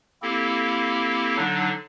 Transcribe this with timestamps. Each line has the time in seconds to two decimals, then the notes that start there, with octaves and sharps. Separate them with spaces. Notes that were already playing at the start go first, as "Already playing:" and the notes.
0.22 A#3 C4 E4 G4 A4
1.37 D3 F#3 D4 D#4